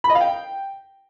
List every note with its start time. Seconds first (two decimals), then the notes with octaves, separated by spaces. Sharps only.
0.04 B5
0.10 D#5
0.15 F5
0.21 G5